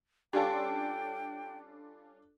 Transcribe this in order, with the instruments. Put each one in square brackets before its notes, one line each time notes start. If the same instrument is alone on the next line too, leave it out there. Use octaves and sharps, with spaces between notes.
[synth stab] G3 C#4 F4 [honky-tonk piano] D4 A4 [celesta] G4 [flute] G5